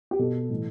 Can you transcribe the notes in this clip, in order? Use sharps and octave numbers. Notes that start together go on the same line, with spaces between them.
G4
B2 A4
A2 E3